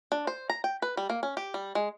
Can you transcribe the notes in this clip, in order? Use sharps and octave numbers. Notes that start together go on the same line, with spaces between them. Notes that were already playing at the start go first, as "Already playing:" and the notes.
D4
C5
A#5
G5
B4
G3
A#3
C#4
G4
G3
G#3